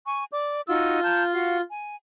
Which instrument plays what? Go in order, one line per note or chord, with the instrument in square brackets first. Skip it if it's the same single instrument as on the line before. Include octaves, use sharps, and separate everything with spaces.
[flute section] G#5 C#6
D5 D6
[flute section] D#4 F#4 E6 [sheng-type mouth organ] F4
[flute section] A5 A#5 G6
F#4 F5
G#5